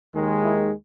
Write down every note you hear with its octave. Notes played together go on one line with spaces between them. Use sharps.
D#2 D#3 G#3
E4